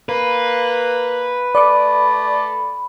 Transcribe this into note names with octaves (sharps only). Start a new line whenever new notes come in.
A#3 B4
A3 D5 B5 D6